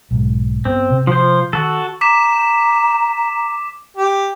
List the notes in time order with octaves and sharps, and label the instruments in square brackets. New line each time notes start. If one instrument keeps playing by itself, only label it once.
[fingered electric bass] B1 G#2
[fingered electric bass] G2 B3 [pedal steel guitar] C4
[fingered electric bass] C3
[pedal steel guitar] F3 C5
[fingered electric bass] D#3 [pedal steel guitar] F#4 A4
[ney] A#5 [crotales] D6 B6 E7
[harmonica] G4